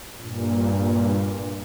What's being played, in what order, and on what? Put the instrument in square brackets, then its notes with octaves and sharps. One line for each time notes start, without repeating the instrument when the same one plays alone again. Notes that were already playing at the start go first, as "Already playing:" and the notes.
[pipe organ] G2 A#2